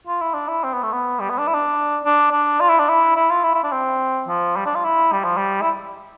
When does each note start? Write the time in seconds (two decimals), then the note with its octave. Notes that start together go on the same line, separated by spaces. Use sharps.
0.07 F4
0.21 E4
0.34 D4
0.48 E4
0.64 C4
0.73 B3
0.83 A3
0.92 B3
1.20 G3
1.29 B3
1.39 D4
1.47 E4
1.54 D4
2.05 D4
2.32 D4
2.60 F4
2.69 E4
2.79 D4
2.89 E4
3.16 E4
3.30 F4
3.44 E4
3.54 E4
3.64 D4
3.72 C4
4.28 F3
4.57 G3
4.66 D4
4.75 F4
4.84 E4
5.12 G3
5.24 F3
5.37 G3
5.61 E4